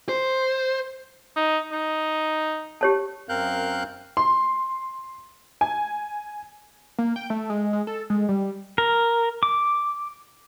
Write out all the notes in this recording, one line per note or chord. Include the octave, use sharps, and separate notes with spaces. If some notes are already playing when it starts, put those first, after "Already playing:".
C5
D#4
D#4
G4 C#5 A5
F#2 C4 A#4 F5 F#6 G6
C6
G#5
A#3
G5
A3
G#3
G#3
A4
G#3
G3
A#4
D6